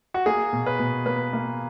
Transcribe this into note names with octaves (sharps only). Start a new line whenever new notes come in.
F#4
A#3 G#4
B2
B4
B2
A#3 B4
A#3